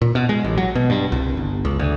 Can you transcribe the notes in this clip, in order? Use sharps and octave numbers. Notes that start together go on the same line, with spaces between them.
A#2
B2
G#3
A1
F#3
B2
G2
C2
G1
C#2
D2